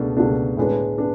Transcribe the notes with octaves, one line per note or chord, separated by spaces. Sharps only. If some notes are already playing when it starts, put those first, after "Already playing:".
Already playing: C#2 B2 A3 D4
C#2 B2 A3 D4
A2 G#3 B3 D4
B3 D4